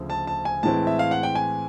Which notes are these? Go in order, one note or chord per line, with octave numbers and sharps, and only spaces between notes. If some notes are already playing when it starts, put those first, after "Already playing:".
Already playing: D2 C#3 F3
A5
A5
G#5
A2 E3 G#3 C4 A5
E5
F5
F#5
G5
G#5